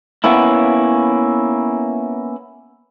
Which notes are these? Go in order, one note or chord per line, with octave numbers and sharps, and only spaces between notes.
A#3 B3 C#4 E4